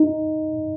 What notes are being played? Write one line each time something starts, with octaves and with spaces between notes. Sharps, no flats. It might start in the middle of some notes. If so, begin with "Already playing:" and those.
Already playing: D#4